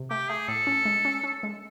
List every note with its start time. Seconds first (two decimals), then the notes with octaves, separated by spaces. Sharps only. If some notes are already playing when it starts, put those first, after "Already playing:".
Already playing: C3
0.10 A3 G4
0.29 A3 G#4
0.48 A2 A4
0.67 C#4
0.85 G#3
1.05 C#4
1.24 C#4
1.43 G#3